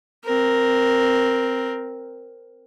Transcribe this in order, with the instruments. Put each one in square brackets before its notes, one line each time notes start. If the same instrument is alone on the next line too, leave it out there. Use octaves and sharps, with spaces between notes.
[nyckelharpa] C4 A#4